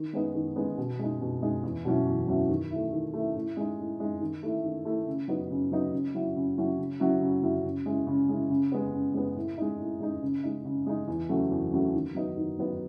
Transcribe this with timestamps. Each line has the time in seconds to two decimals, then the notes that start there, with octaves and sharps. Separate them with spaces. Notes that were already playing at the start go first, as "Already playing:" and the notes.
Already playing: D#3
0.13 G#3 B3 D#4
0.35 D#3
0.56 G#3 B3 D#4
0.78 B2
0.99 G#3 D#4
1.21 B2
1.42 G#3 D#4
1.64 E2
1.85 B2 F#3 C#4 E4
2.07 E2
2.27 B2 F#3 C#4 E4
2.49 D#3
2.70 A3 E4
2.93 D#3
3.13 A3 E4
3.35 A2
3.57 G#3 D#4
3.78 A2
4.00 G#3 D#4
4.21 D#3
4.43 A3 E4
4.64 D#3
4.85 A3 E4
5.07 C#3
5.28 F#3 B3 D#4
5.50 C#3
5.72 F#3 B3 D#4
5.93 C#3
6.14 F#3 C#4 E4
6.36 C#3
6.57 F#3 C#4 E4
6.78 C#3
7.00 F#3 C#4 E4
7.21 C#3
7.43 F#3 C#4 E4
7.65 C#3
7.86 G#3 C#4 E4
8.07 C#3
8.29 G#3 C#4 E4
8.50 C#3
8.72 G#3 B3
8.94 C#3
9.14 G#3 B3
9.36 A2
9.58 G#3 D#4
9.79 A2
10.00 G#3 D#4
10.22 C#3
10.44 G#3 D#4
10.65 C#3
10.86 G#3 D#4
11.08 E2
11.29 C#3 F#3 A3
11.51 E2
11.72 C#3 F#3 A3
11.94 D#3
12.15 F#3 B3 D#4
12.37 D#3
12.59 F#3 B3 D#4